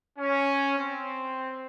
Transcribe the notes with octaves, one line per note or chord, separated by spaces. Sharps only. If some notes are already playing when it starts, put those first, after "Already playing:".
C#4
C4